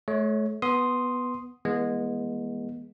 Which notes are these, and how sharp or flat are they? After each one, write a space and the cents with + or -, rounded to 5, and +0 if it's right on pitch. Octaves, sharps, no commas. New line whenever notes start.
A3 -35 C#5 +0
B3 +0 C6 +0 D#6 +0
E3 +0 G#3 -5 B3 -35